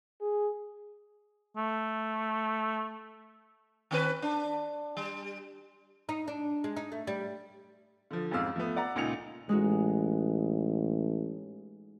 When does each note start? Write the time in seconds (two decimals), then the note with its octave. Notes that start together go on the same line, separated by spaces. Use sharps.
0.21 G#4
1.57 A3
3.91 D#3 C4 B4
4.22 D4
4.97 G3
6.09 D#4
6.28 D4
6.64 G#3
6.77 D#4
6.92 A3
7.07 G3
8.11 D3 F3
8.31 A1 F2 G#2 F5 E6
8.56 F3 A3 B3
8.76 D5 F#5 A#5
8.96 C#2 A#2 D#4 F4 C#7 F7
9.49 A1 G#3 D#4 F#4